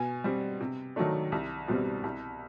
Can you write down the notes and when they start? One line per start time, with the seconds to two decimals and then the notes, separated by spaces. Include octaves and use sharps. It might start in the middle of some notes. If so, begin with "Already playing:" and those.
Already playing: B2 G#5
0.24 G3 C4
0.61 C3
0.96 D#3 F#3 A3 D4
1.32 C2
1.68 B2 G3 C4
2.03 C2